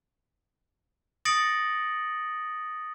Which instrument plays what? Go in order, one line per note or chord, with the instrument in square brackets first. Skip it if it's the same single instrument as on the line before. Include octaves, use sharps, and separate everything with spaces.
[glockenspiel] D#6 A6 A#6 C#7 D7 F#7